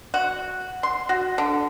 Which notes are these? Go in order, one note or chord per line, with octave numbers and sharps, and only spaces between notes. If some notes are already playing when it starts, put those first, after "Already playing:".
F#4
C6
F#4
D3